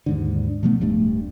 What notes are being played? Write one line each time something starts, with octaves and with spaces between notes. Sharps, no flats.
D#2 G#2 D3
B2 F3 A3 B3
D1 G2 A3